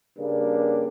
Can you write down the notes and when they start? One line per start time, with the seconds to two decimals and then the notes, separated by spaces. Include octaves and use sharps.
0.18 G2 C#3 A#3 D4